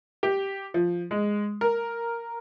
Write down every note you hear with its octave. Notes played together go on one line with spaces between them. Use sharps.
G4
F3
G#3
A#4